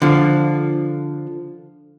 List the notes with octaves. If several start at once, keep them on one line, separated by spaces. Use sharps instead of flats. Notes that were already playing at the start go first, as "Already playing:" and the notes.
D3 F3